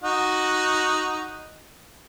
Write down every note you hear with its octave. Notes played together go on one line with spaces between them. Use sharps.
D#4 F#4 F#5